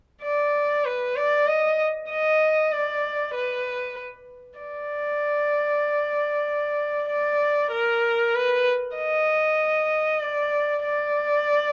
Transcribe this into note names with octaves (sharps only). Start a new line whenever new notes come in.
D5
B4
D5
D#5
D#5
D5
B4
D5
D5
A#4
B4
D#5
D5
D5